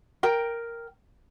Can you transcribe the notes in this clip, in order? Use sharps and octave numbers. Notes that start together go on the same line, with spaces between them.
A#4 G5